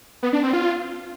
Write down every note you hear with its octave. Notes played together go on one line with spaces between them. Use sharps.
B3
D4
C4
F4